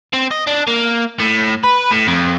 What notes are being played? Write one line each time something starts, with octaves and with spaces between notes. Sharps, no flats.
C4
D#5
D4
A#3
A2
B4
A2
F2